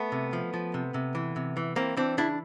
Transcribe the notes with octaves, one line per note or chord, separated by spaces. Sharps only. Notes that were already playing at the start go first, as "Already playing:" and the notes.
Already playing: A3 B3
C3
F3
F3
C3
C3
E3
C3
E3
E3 A#3 C4
E3 C4 D4
C#3 D4 E4